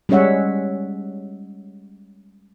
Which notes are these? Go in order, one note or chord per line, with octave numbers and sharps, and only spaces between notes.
G3 G#3 C#4 C#5 E5 F#5